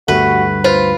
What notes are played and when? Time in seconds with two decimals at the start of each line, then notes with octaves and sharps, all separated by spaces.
0.08 D2 G2 G3 A3 F#4 B4
0.64 F4 B4 C5